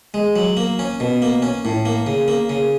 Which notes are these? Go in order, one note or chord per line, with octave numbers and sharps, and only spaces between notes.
G#3
F#3
A#3
C#4
B2
A#3
C#4
A2
A#3
C#3
A#3
C#3